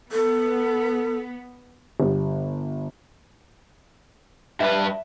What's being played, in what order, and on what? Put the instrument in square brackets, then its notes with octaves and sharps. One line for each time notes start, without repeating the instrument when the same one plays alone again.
[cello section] B3 [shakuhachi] A4
[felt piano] G1 G3
[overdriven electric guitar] G2 B4 [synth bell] E5